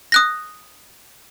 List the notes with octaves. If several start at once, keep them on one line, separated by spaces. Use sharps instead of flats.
D#6 F#6 A#6